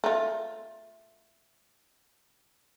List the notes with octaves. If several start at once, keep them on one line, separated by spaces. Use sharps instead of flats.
A3 F4